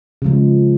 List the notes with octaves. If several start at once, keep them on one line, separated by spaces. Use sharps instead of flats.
C#3 F3 G#3